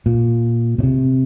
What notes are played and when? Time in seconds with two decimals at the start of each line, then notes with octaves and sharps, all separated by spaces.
0.06 A#2
0.78 B2
0.83 C3